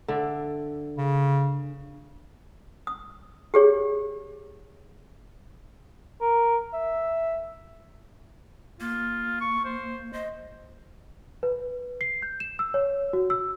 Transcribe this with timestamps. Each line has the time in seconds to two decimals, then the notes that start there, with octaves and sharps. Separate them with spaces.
0.08 D3 D5 E5
0.97 C#3
2.87 D#6
3.54 G4 G#4 C#5
6.21 A#4
6.74 E5
8.80 A#3 F4
9.41 C#6
9.65 C5
10.13 C5 D#5
11.43 B4
12.01 C7
12.22 G6
12.40 E7
12.59 E6
12.74 C#5
13.13 F#4
13.30 E6